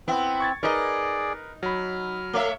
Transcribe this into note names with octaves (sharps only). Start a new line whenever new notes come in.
B3 C4 E4
C#6 G#6 A6
D#4 G#4 A#4 B4 D5 D#5 A#5
F#3 B5 F6
A3 C#5 E5